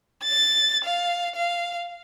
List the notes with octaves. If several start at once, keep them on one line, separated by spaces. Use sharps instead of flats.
A6
F5
F5